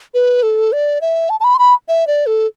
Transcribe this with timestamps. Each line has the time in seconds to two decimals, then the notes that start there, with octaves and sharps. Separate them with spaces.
0.14 B4
0.43 A4
0.72 D5
1.01 E5
1.30 A5
1.40 A5
1.44 B5
1.55 C6
1.59 B5
1.88 E5
2.07 D5
2.26 A4